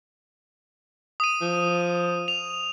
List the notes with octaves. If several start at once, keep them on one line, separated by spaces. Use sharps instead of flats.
D#6 D#7
F3
F7